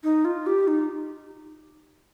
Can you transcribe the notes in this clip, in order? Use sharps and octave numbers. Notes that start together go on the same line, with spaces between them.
D#4
F4
G4
D#4